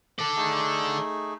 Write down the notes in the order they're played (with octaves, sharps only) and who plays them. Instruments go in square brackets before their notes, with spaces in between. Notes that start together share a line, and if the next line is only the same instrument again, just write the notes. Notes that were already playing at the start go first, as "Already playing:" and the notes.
[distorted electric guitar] A4 D5
[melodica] A3 D#4 G#4